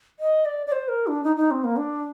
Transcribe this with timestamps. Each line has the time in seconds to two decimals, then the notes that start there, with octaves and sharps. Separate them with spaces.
0.20 D#5
0.45 D5
0.67 D5
0.72 C5
0.88 A#4
1.07 D4
1.24 D#4
1.37 D#4
1.51 C4
1.64 A#3
1.77 D4